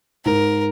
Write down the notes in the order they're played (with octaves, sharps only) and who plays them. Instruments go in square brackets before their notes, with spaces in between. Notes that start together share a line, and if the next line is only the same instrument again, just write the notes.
[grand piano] G#2 [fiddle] A#4